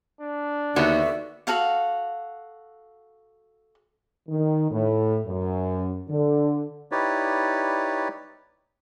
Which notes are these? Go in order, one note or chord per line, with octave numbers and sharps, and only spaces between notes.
D4
D#2 D3 B3 F#4 E5
F#4 A4 F5 F#5
D#3
A2
F#2
D3
D#4 E4 G4 B4 C#5 D5